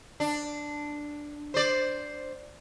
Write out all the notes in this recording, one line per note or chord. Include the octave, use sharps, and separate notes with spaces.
D4
C5 D5